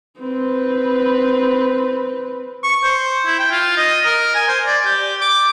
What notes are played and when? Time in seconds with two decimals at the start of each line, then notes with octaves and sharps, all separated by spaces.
0.19 C4 B4
2.63 C#6
2.83 C5
3.26 E4
3.39 G5
3.52 F4
3.77 D#5
4.06 A#4
4.35 G#5
4.48 C5
4.66 D5
4.85 G4
5.21 D6